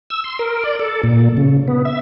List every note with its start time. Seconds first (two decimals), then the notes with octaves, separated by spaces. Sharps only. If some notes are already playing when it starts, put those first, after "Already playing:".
0.10 E6
0.24 C6
0.39 A#4
0.64 D5
0.79 A4
1.03 A#2
1.37 C#3
1.68 B3
1.85 E5